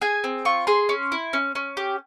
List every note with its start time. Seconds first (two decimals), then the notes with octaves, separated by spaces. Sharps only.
0.02 G#4 G#5
0.24 C4
0.45 F4 C#6
0.67 G#4 C6
0.89 C#4
1.12 E4
1.33 C#4
1.55 C#4
1.77 G4